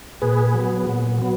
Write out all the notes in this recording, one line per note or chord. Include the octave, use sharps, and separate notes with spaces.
A#2 G#4 B4
F#3 B3
A#2
F#3 B3